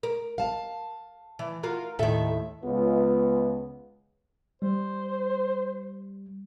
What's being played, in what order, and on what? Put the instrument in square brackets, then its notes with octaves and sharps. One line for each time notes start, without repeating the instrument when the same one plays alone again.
[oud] A#4
[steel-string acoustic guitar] F5 A5
[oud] E3
F4 F#4 A#4
[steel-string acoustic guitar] D#2 A2 E5 [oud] D#3 A4
[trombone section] C#2 B3
[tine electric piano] G3 [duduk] C5